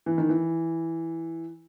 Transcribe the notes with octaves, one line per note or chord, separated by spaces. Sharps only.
E3
D#3
E3